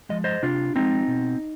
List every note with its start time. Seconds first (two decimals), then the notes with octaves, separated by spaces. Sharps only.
0.09 F3 G#3 D#5
0.24 C5 D#5
0.42 C3 D4 F4
0.75 F3 G#3 C4 D#4
1.08 B2